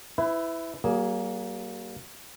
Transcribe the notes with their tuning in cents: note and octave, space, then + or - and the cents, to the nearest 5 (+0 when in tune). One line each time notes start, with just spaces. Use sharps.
E4 +0 B4 +30
F#3 +45 A#3 +5 G#4 +0